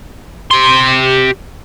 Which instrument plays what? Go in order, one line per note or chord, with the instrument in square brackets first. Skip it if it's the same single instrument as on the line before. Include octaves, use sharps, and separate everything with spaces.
[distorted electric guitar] G4 C6